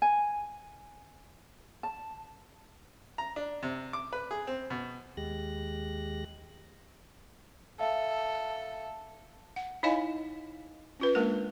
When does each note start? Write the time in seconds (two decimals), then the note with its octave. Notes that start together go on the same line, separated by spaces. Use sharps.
0.02 G#5
1.83 A5
3.18 A#5
3.36 D4
3.63 C3
3.93 D6
4.13 B4
4.31 G#4
4.47 C4
4.70 B2
5.17 D#2 G#3 G4 F#6 A#6
7.80 A4 E5 F5
9.56 F#5
9.83 D#4 E4 C#5 D#5 F5 G#5
11.00 C#4 F4 B4
11.15 G#3 A#3 D4 A#4